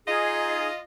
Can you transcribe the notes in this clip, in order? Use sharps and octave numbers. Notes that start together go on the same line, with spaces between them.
D#4 F4 G#4 D#5